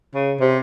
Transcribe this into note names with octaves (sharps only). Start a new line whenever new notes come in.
C#3
C3